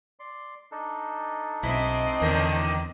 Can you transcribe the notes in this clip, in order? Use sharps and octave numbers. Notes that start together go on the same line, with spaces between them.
D5 C6
D4 D#4 A4
B1 C4 E4 D#5
E2 A2 D3 D#3